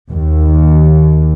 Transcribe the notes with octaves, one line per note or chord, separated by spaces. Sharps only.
D#2